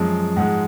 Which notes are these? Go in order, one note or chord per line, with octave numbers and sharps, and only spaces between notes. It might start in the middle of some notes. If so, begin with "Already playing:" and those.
Already playing: F#2 F3 G#3
G#2 F3 G#3 F#5